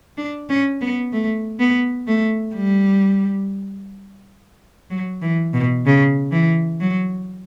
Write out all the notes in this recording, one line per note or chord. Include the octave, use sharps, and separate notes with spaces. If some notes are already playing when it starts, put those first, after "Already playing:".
D4
C#4
B3
A3
B3
A3
G3
F#3
E3
B2
C#3
E3
F#3